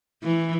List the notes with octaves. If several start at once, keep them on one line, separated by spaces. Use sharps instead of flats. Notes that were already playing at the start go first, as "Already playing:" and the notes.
E3